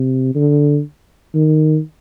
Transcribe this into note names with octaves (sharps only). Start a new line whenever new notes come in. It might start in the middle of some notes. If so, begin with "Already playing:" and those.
Already playing: C3
D3
D#3